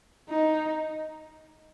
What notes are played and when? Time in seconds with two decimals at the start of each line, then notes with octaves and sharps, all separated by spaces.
0.29 D#4